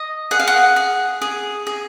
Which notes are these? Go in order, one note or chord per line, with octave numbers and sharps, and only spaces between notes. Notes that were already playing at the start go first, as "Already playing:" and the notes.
Already playing: D#5
G#4 F#5
F5
F#5
G#4
G#4
G#4